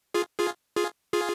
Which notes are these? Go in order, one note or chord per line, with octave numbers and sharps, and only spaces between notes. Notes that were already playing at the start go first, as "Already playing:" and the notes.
F4 G#4
F4 G#4
F4 G#4
F4 G#4